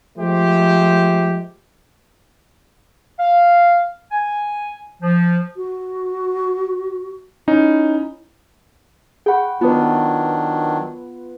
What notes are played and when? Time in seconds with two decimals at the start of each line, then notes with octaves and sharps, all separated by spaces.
0.18 F3 G#3 A3 G4 C5
3.19 F5
4.12 G#5
5.02 F3
5.57 F#4
7.48 C#4 D#4 E4
9.26 G#4 F#5 G5 B5 C#6
9.61 D#3 F#3 B3 D4 F4 B4 D#6